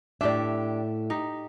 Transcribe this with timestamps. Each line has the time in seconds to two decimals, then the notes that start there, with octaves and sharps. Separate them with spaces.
0.21 A2 D4 G4 D5 E5
1.10 D#4 G4